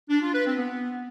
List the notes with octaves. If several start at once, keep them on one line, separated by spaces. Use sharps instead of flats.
D4
F4
B4
C4
B3